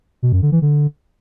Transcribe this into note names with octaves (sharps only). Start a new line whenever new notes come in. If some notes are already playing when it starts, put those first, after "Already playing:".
B2
F#2
D3
E3
D3